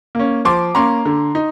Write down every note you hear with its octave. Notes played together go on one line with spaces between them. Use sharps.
A#3 C#4
F3 C6 D6
A#3 C#4 A#5 C6
D3
D#4